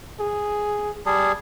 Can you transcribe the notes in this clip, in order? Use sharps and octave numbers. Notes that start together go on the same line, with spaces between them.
G#4
G3 G#4 A5